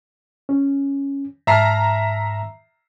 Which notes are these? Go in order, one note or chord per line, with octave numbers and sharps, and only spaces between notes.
C#4
G#2 E5 A5 A#5 F6 C7